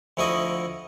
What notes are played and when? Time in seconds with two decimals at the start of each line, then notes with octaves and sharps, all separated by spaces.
0.17 D2 F3 E4 F#4 D#5 C#6